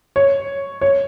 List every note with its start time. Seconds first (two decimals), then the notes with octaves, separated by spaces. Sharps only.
0.16 C#5
0.81 C#5